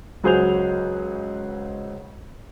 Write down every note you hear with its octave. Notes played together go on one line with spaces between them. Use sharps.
C#2 F#3 G#4 C5 G6 F7